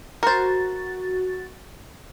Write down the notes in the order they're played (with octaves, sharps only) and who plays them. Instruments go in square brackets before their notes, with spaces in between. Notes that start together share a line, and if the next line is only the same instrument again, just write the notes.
[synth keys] F#4 A6 [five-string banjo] A#4 C5